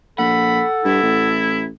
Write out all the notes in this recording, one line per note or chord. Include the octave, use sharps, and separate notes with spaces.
A#1 A4 F#5 B5
G2 E4
A1